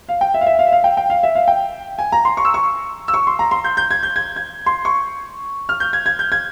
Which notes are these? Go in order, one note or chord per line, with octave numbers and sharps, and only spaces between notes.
F5
G5
E5
F5
E5
F5
E5
F5
G5
G5
F5
E5
F5
G5
G#5
A#5
C6
C#6
E6
C#6
E6
C#6
C6
A#5
C6
G6
G6
G#6
G6
G#6
G#6
C6
C#6
F6
G6
G#6
G#6
G6
G#6